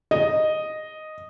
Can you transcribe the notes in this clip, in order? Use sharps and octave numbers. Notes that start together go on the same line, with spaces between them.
D#5